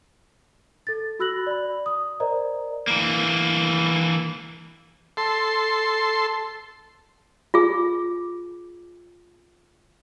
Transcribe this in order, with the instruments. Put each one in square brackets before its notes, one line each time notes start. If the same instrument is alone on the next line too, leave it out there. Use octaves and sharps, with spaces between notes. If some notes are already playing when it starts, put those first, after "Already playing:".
[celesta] A4 A6
F#4 B5 E6 F#6 A#6 F#7
D5 B5
D#6
A#4 C5 D5 D#5 A#5
[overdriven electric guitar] E3 A#3
[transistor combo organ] A4 C6
[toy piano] F4 G#4